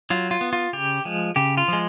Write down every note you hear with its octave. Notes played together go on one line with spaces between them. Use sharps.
F#3 F4
F4
B3
F4
C#3 G4
F3 G#3
C#3 G4
F4
F3 G#3